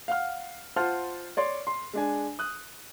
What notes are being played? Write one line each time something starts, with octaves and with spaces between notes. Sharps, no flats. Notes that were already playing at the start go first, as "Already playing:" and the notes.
F5 F#5 F6
F4 C5 F#5 A5 F6
C#5 D5 C6
C6
G#3 D4 G#5
D#6 F#6